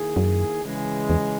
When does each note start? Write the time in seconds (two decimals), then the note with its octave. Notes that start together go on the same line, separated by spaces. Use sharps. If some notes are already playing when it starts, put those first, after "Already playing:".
Already playing: D#3 A#3 E4 G#4
0.16 F#2
0.63 C#3 E3 G#3
1.10 E2